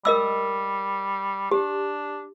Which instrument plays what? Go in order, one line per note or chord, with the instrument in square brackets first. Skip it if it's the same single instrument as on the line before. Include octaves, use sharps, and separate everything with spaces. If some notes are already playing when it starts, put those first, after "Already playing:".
[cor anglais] G3 [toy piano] A#4 D#5 E6
[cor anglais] D4 [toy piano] G4